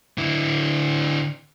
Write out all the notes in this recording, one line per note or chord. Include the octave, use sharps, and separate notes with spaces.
D3 E4